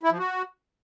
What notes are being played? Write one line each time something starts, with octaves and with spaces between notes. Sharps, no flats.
E4
F3
F#4